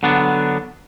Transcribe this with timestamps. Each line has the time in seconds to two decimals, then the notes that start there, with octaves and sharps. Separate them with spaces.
0.03 D3 F#3 B3 D4